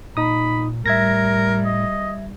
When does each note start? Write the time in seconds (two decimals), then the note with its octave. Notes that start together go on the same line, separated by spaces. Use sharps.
0.17 A#2 D#4 B5 D#6
0.86 A2 G3 A#4 E5 G#6 A#6
1.65 D#5